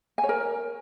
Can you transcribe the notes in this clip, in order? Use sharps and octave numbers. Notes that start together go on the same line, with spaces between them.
G#5
C#5
A#4